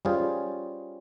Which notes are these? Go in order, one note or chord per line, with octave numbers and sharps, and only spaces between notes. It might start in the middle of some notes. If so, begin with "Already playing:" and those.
G3 C#4 F4 G#4 C5